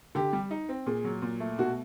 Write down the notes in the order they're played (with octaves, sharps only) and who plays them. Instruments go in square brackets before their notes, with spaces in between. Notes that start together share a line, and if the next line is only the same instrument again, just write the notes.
[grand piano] D3 [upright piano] G4
[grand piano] G3
D#4
C4
[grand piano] A#2 [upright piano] G#4
[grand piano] F#3
A#2
A3
[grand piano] B2 [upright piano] F#4